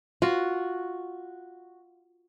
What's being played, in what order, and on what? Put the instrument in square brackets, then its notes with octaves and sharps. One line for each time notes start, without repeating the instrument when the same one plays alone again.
[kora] F4 [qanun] F#4